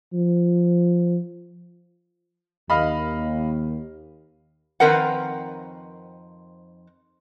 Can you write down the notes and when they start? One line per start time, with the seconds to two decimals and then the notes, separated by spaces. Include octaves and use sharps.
0.13 F3
2.70 D#2 D#5 F5 B5
4.80 F2 D#3 C4 A#4 B4 F#5